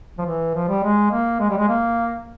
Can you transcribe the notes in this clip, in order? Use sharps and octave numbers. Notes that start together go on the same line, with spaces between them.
F3
E3
F3
G3
G#3
A#3
G#3
G3
G#3
A#3